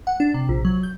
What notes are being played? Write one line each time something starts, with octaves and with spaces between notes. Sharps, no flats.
F#5
D4
C3
A#1
F#3
G6